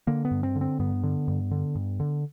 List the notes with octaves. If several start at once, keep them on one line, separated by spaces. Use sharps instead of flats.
D3 A#3
B3
G2
C4
D3
C4
G2 B3
D3
G2
D3
G2
D3